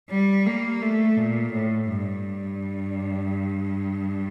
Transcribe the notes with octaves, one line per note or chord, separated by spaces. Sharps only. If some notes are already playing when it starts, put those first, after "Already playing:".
G3
A#3
A3
A#2
A2
G2